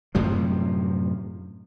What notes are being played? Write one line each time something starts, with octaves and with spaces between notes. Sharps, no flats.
F#2 A2 C3 F3